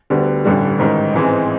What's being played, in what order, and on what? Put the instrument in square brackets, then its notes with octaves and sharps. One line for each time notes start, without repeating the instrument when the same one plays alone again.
[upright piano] D2 D3 G3 B3
A1 G2 D3 G3
A1 G#2 D#3
A1 G#2 E3 G#3 C4